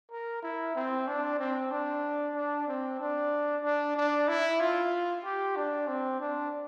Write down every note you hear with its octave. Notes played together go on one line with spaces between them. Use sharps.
A#4
E4
C4
D4
C4
D4
D4
C4
D4
D4
D4
E4
F4
G4
D4
C4
D4